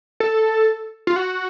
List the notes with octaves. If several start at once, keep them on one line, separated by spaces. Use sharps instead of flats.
A4
F4
F#4